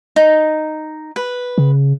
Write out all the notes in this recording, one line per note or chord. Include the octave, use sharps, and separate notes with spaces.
D#4
B4
C#3